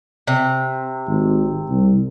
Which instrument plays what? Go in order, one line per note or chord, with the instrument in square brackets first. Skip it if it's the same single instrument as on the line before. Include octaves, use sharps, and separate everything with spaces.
[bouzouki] C3
[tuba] G#1
C2